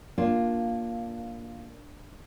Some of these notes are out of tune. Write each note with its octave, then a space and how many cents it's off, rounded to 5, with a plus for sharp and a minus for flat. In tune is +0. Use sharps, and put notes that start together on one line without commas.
A#3 +5 D4 +0 F4 +0